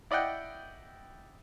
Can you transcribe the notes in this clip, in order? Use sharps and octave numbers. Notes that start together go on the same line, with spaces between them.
E4 D5 D#5 F#5 G5